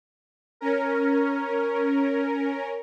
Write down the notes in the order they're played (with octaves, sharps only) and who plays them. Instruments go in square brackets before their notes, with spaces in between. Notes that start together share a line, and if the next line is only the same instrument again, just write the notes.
[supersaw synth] C#4 A#4